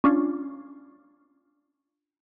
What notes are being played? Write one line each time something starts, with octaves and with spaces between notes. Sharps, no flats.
C#4 D4 F4